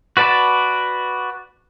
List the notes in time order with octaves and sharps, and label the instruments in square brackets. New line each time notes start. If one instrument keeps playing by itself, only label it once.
[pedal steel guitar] F#4 B4 D5 A5